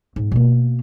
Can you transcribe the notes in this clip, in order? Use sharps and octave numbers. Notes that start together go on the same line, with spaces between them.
G#2
B2 A#3